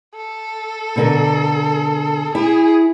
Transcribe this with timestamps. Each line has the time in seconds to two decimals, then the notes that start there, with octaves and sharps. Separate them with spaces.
0.16 A4
0.96 B2 D3 A#4
2.35 E4 G#4